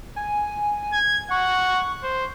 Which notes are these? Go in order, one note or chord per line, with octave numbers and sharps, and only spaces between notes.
G#5
G#6
F#5 C#6
C5